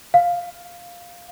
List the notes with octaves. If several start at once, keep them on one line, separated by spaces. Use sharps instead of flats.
F5